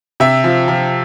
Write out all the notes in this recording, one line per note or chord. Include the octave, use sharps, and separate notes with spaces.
C3 E5
F3
F3